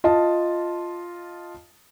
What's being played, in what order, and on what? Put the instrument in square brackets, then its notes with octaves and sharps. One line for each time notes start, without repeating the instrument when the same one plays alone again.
[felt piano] F4 D#5 A5